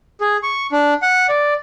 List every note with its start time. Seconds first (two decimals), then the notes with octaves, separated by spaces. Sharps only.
0.21 G#4
0.43 C#6
0.72 D4
1.02 F#5
1.29 D5